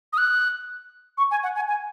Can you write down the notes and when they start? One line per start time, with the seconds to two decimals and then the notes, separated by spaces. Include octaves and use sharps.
0.13 D#6
0.18 F#6
1.18 C#6
1.31 G#5
1.43 F#5
1.55 G#5
1.68 G#5